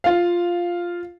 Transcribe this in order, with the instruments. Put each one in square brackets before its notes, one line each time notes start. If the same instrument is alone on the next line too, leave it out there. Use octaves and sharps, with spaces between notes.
[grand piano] F4 F5